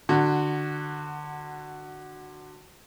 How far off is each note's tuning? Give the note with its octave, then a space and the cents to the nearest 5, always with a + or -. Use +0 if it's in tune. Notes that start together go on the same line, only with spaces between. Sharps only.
D3 +25 F#4 +0